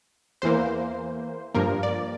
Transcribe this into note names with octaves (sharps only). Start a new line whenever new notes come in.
E2 E3 A#3 C5
G2 F3 A#3 A#4
D5